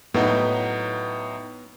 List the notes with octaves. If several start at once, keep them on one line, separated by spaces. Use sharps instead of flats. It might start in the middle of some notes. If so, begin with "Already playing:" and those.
A2 F#3 B3 D#4